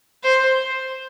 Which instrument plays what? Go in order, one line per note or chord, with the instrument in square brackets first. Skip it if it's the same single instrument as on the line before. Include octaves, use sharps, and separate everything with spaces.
[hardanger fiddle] C5